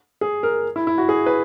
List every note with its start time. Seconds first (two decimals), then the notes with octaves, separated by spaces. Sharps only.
0.21 G#4
0.43 A#4
0.76 E4
0.87 E4
0.98 F#4
1.09 G#4
1.26 B4